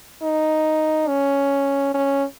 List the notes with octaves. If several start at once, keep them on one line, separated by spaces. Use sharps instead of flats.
D#4
C#4
C#4